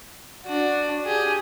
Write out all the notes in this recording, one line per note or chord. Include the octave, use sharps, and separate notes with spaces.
D4 F#4
G4 G#4